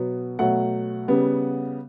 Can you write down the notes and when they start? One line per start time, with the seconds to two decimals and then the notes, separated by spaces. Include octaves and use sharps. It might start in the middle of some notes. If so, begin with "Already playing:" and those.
Already playing: B2 F#3 B3
0.39 B2 F#3 A3 F#5
1.08 C#3 G3 B3